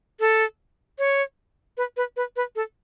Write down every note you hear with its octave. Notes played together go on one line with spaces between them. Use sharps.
A4
C#5
B4
B4
B4
B4
A4